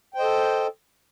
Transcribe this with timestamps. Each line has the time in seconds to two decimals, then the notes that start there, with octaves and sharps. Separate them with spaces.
0.14 G5
0.17 C5
0.19 D#5
0.22 A4